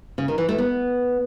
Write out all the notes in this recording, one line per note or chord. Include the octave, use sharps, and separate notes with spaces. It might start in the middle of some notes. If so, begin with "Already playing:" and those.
C#3
D#3
E3
A3
B3